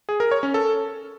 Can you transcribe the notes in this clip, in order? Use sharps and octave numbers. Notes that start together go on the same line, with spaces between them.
G#4
A#4
C#5
C#4
A4